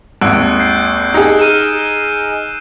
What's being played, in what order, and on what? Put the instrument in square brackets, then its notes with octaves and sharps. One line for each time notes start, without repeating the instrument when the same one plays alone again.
[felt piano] G#1 D#2 [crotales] E6 F#6 D7
[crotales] G6 C7
[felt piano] D#4 G#4
[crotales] F6 D#7 E7